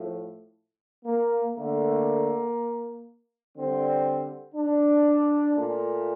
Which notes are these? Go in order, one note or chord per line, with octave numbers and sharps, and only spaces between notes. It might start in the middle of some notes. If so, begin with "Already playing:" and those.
Already playing: A2 F3 A3
A#3
D3 A3 A#3
D3 G3 C4
D4
A#2 A3